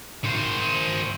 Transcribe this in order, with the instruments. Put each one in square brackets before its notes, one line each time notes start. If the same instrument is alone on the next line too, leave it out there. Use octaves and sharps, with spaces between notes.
[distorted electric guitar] D#3 C5